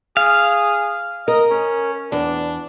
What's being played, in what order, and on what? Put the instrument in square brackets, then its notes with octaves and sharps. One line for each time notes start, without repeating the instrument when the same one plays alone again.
[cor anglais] G#4 [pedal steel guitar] F5
[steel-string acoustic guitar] A#4 [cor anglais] D#5
[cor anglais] C#4
[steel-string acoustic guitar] E2 [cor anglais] D4